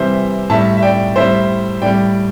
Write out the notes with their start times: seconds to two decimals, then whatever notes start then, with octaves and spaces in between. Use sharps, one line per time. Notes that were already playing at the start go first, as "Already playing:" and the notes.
Already playing: C3 E3 G3 C5 E5
0.50 A2 G3 E5 A5
0.77 E5
0.83 D5 G5
1.16 A2 G3 C5 E5
1.82 A2 G3 D5 G5